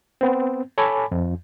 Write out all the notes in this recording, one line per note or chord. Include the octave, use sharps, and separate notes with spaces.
B3 C4
A4 C#5 G#5 A5 B5 D6
F2